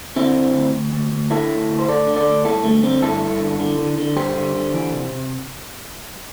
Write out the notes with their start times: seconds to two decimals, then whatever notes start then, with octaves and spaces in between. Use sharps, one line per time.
0.16 D3 C4 E4
0.36 D3
0.54 D2
0.74 D2
0.93 D2
1.12 D2
1.31 D3 E4 A4
1.50 D2
1.69 D2
1.79 C5
1.88 D2 A4 D5
2.07 D3
2.16 A4 D5
2.26 D2
2.45 G2 E4 A4
2.64 D3 A3
2.83 D3 C4
3.02 G2 E4 A4
3.22 G2
3.40 D3
3.59 D3
3.79 D3
3.98 D3
4.16 G2 G4 C5
4.35 D3
4.55 D3
4.74 E3
4.93 C3
5.11 C3